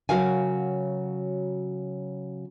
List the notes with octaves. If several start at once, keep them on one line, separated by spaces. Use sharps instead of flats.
C#3 F#3 F#4 A#4 F5 G#5